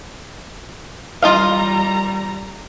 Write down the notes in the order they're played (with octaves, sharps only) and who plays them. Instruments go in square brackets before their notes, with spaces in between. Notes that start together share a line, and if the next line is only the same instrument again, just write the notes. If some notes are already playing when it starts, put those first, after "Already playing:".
[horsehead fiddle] G3 A#5 [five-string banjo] F4 D#5 F5